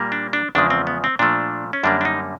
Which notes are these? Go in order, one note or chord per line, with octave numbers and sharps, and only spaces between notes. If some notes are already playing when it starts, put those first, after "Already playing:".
Already playing: A#2 G3 A#3
D4
D4
E2 C#3 F3 G#3 D4
C4
B3
C4
A#2 F3 A3 D4
C#4
F#2 D3 G3 A#3 D4
D4
D#4